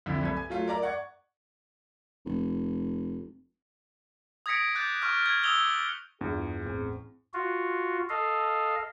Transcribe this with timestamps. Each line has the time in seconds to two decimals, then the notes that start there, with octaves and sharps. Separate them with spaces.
0.06 C2 F2 D3 E4
0.23 C2 A4 B4 G#6
0.36 G#5
0.50 F#3 A3 F4
0.68 A#4 D5 A#5
0.82 D5 F#5 C#6 G#6
2.26 F1
4.46 D#6 G#6 A#6 B6 C#7 D7
4.75 D6 F#6 G6 A6
5.02 C#6 D#6 F6
5.26 G#6
5.43 D#6 E6 G#6 F7 G7
6.21 E2 G2 F4 G#4
6.64 A1 C4
7.34 F4 F#4
8.09 A4 D#5 F5